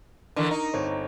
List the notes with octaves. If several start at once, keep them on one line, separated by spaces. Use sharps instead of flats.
D3 E3 A#4 C#6
D#4
G1 C4 C#5